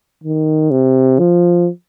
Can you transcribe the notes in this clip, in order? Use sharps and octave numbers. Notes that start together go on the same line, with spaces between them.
D#3
C3
F3